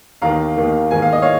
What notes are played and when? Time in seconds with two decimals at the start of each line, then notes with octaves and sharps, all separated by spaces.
0.22 D#2 D#3 A#3 F5 A#5
0.57 D#2 D#3 A#3
0.91 G#2 D#3 A#3 G#5
1.02 F5
1.13 D#5
1.22 C#5 F5